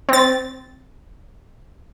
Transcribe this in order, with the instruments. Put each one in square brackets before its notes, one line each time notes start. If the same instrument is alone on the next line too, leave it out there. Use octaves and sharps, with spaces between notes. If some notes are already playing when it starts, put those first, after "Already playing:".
[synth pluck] C4 A6